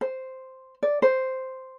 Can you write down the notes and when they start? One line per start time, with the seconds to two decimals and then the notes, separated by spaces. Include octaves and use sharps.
0.01 C5
0.83 D5
1.02 C5